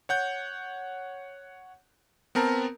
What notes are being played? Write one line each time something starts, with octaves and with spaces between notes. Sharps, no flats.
C#5 F#5 G6
B3 C4 A#4 A5 A#5